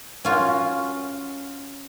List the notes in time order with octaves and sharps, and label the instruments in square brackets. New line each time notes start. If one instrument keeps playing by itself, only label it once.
[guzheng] C#4 F4 F#4